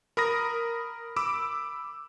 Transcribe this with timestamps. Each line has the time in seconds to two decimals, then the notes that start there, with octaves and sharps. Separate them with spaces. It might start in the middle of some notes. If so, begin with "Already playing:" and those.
0.17 A#4 B5 D#6 A#6
1.16 B5 D6 E6